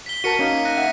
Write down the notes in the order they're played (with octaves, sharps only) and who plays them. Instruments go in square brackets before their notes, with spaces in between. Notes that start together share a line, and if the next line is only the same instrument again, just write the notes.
[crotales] B6 G7
[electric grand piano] F#4 A#4 A5 [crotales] B6 C#7 D#7
[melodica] A#3 D#4 [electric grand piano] C#4
[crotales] F#6 A#6 D#7
[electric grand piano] E5 F#5